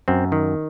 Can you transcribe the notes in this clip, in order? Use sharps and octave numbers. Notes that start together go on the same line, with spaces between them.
F#2 C4
D#3